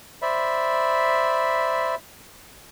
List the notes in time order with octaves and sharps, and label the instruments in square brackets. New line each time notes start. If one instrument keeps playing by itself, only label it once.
[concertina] C5 D5 E5 B5